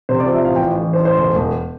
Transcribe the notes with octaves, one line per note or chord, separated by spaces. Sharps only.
C3 C5
D5
F3
E5
A1 F5
G5
A1
E3
C5
A1
C5
E1
E1